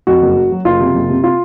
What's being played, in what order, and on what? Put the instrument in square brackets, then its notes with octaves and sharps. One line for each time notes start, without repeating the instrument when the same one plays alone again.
[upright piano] F2 F#4
F#1
F#3
F#3
F#1 F4
C3
F#1
C3
F4